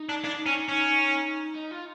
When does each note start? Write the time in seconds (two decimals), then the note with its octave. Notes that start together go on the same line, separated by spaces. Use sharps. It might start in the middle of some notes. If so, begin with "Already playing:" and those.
Already playing: D#4
0.09 D4
0.25 D4
0.46 C#4
0.69 C#4
1.55 D#4
1.71 F4